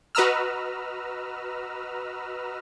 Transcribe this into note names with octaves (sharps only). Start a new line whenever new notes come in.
F#4 B4 D#5 A#5 E6 F6